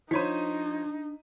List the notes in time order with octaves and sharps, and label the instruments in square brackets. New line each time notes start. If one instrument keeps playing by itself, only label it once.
[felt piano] F3 D#7 [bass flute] D4 [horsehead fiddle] D#4 [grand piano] C5 C#5 B6